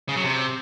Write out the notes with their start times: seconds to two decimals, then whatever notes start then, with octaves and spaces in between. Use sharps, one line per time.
0.09 C#3
0.16 F#3
0.23 C3